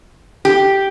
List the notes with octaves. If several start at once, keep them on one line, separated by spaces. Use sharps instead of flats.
G4